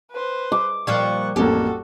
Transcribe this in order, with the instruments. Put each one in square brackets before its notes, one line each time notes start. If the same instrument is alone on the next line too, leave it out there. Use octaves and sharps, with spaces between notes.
[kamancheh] B4 C5
[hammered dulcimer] D6
[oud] A#2 F3 G3 [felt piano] D5 [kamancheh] C#6 F#6
[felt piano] A1 F2 A#3 [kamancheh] F#4 A4 [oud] G4